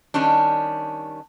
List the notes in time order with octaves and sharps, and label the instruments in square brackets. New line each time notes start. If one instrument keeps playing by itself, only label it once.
[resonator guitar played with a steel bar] D#3 G3 C#4 D4